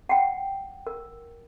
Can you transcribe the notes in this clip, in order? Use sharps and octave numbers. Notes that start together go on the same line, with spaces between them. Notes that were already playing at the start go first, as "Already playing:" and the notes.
F#5 G5
A#4